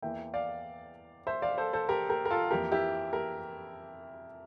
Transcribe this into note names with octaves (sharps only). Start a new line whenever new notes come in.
E2 E3 A#3 E5 G5
D5 F5
C5 E5
D5 F5
A4 C5
A4 C5
G4 A#4
G4 A#4
A#4
F4 A4
F2 E3 A#3 G4 A#4
E4 G4
G4 A#4